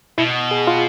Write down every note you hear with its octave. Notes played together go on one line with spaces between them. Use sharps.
B2 E4
G#4
F4